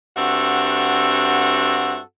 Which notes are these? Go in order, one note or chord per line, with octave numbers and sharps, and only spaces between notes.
G2 C4 F#4 A4 E5 F#5